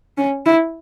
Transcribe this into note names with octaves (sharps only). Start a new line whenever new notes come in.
C#4
E4